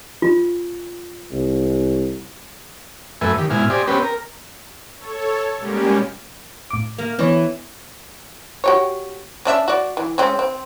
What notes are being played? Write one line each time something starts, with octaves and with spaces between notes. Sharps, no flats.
F4
C2
F#2 A3 B4 E5 G#5
D#3 G4
G#2 B2 E4 G#5 F6
G4 C5 D5 D#5 G#5
B3 C#4 G4 B4 C5 G5
A#4
A4 C#5
B2 G3 G#3 A#3 C#4 G4
A2 D6
A#3
E3 B3 C#5
F#4 G4 C#5
C#4 D4 E5
F#4 D5
E3
G#3 C4 C#4
C4